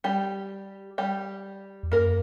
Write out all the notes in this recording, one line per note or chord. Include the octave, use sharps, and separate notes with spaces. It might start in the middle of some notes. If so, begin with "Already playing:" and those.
G3 G4
G3 G4
E2
F#2 A#3 A#4